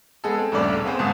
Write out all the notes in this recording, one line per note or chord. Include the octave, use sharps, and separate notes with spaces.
G#3 B3 G#4 A4
C4
D#1 G2 C#3 A3 D5
B1
B3 C4 G#4 C5
G#1 C#2 G#2 A5 D#6